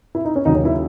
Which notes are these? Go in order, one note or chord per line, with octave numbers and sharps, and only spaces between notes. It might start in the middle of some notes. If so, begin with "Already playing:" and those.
E4
D#4
C#4
D#2 C#3 F#3 D#4
C#4
E4